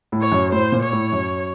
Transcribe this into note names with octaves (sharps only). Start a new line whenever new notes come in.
A2
C#5
F#2
A2 C5
A#2
C#5
A2
F#2